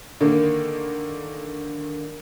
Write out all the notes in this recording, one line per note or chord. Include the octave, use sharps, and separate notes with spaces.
D3 D#3 A#3